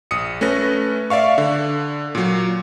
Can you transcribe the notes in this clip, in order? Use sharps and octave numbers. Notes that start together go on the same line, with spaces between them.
A#1 D#6 C#7
A3 C#4 B4 A#6
D5 E5 F5 C#6
D3
A#2 F#3